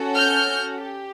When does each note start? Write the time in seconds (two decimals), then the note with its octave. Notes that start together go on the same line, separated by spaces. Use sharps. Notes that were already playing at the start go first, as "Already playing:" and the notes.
Already playing: C#4 F#4 A4
0.14 F6 G6
0.82 G4